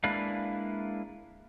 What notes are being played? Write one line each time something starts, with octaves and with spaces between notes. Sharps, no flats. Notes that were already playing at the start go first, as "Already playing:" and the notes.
G#3 A#3 D4 E4 B4 F5